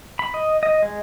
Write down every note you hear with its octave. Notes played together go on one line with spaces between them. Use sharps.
B5
D#5
D#5
G#3